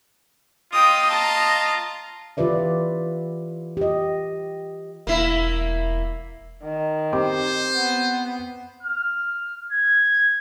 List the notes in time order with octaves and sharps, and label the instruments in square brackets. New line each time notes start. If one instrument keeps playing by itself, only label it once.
[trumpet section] F4 D#5 [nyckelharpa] G5 D#6
[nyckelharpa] A5 A#5
[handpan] E3 F4 G4 B4 D5 E5
G4 D#5
[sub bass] E1 [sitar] A#3 E4
[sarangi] D#3
[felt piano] C4 G4 D6 [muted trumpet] C5
[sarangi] B3
[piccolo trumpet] F6
G#6